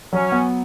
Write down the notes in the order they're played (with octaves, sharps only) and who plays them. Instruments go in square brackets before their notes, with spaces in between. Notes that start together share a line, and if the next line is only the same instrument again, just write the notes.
[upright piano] F#3 [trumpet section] C#4
[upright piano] B3